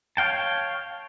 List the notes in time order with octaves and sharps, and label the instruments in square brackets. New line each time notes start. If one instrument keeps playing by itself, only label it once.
[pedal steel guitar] C#5 F5 G5 A5